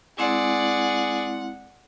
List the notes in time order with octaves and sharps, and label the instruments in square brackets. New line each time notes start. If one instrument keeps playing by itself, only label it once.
[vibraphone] G#3 C4 E4 [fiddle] G#4 D5 [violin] F#5